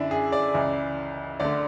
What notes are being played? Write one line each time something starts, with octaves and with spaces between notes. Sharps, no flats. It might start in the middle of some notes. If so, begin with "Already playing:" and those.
Already playing: F#2 D3 D4 E4
G#4
D5
C#2 C#3 E3
D2 D3 D5